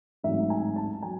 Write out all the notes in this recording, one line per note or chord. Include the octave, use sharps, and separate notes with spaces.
A1 G#2 F#3 C4 E5
G#5
A5
F#3 G#5